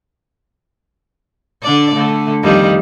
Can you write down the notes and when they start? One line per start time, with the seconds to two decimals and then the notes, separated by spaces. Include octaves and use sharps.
1.63 D3 D4 D5
1.95 D3 A3
2.43 F2 D#3 G3